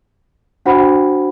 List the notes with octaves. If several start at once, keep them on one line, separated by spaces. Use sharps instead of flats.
D4 F#4 C5 F#5 B5